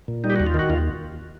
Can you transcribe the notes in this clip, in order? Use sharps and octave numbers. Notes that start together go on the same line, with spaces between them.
A#2
G3 D#4
G4
D#2 F#4
F4
D#3 F#4
D#2 F4